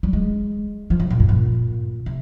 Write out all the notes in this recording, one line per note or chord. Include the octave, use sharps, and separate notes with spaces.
G3
G#3
F3
C#3
A#2
G2
A#2
C3